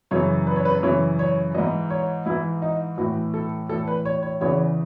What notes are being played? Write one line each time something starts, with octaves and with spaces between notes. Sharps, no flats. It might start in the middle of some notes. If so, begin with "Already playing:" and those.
F#2 C#3 E3 C#5
B4
C#5
B4
F#2 C#3 E3 C#5
C#5
G#2 E3 D#5
C#5
G#2 E3 E4
D#4
A2 E3 F#4
A4
A2 E3 A4
B4
C#5
C#5
E2 C#3 E3 C#5